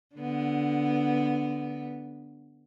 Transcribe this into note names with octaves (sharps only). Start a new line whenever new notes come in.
D3 B3